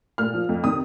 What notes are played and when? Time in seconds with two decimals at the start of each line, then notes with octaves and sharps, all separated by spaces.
0.18 A#2 F6
0.34 F3
0.49 F2
0.63 C3 D#3 D#6